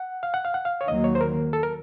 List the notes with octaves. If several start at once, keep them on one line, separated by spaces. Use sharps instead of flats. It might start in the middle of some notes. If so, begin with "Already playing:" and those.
Already playing: F#5
F5
F#5
F5
F#5
F5
C#5
D#2 D#3 F#3 A#3 D#5
C#5
C5
A#4
A4
A#4